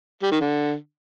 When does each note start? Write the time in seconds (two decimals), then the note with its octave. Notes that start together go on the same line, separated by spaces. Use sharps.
0.22 G3
0.31 D#3
0.41 D3